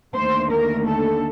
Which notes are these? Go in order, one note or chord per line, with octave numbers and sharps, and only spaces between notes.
D#2 D3 A3 C5
A#4
A4